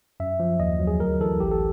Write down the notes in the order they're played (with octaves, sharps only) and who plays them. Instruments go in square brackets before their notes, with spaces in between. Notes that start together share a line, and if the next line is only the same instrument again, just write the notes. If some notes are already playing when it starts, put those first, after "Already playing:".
[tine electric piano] F#2 E5
F3
D#2 D#5
F#3
G#4
D2 A#4
E3 A4
A1 G4
A4